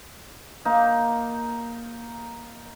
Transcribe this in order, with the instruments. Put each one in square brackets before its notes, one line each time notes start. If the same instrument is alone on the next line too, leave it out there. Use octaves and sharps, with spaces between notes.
[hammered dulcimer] A#3 D#4